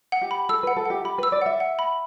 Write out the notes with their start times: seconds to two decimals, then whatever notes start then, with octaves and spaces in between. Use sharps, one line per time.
0.12 F#5
0.22 G4
0.31 B5
0.49 A4 E6
0.63 B4 F#5
0.76 A4
0.85 G4 F#5
1.05 G4 B5
1.18 B4 E6
1.32 D5
1.42 E5 F#5
1.60 F#5
1.79 B5